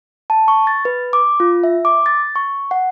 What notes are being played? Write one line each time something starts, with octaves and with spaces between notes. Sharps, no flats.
A5
C#6
A6
B4
D6
F4
E5
D6
A6
C#6
F#5